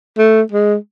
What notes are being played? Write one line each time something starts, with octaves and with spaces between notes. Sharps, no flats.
A3
G#3